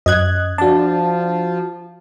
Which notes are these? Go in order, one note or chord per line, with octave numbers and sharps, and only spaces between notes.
F#2 D#5 F#6 G#6
F3 D4 F#4 A5